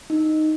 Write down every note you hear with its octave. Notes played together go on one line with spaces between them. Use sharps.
D#4